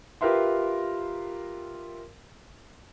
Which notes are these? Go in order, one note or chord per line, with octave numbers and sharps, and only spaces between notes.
F4 G4 A#4 B4 E5 C6